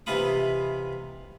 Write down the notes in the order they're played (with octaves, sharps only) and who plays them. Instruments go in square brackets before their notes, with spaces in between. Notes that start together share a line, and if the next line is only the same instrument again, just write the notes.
[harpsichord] C3 E3 D#4 F4 B5 D#6